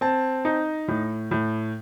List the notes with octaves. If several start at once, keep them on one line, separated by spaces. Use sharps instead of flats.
C4 A5
D#4
A2
A2